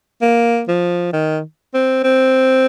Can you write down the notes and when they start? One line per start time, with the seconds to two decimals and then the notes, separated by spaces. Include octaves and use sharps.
0.22 A#3
0.68 F3
1.13 D#3
1.74 C4
2.04 C4